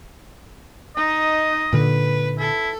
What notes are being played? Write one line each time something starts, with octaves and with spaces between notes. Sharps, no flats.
D#4 D#5
A#2 D3 B4
E4 A4